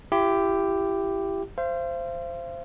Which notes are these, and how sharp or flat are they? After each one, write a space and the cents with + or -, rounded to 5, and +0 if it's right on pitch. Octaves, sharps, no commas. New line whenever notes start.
E4 +35 G4 +0
C5 +0 F5 -40